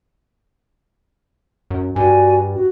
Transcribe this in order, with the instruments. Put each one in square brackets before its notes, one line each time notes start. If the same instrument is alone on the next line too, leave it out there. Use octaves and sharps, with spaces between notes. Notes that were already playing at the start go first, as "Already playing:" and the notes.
[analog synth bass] F#2
[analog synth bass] G2 [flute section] F#4 D5 G#5
[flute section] F#4